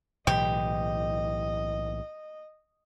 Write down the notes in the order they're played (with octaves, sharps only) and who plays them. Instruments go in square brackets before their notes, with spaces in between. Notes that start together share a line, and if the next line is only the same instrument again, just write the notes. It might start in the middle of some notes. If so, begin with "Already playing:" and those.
[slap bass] B1 A2 E3 [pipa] G4 [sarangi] D#5